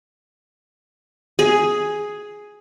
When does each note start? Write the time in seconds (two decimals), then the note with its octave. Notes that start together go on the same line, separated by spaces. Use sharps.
1.39 G#4